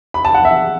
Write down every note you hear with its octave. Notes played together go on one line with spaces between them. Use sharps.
B5
A5
F#5
E5